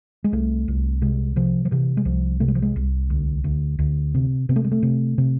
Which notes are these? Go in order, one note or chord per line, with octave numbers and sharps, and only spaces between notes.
G#3
C2 A3
C2
C3 G#3
C3 F3
F3
C3 E3
G#3
C2 F3
C3 A3
G#3
F3
G#3
C2
D2
D2
D2
C3
C3 B3
A3
G#3
A3
C3
C3